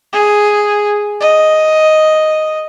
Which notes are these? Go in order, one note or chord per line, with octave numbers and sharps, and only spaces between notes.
G#4
D#5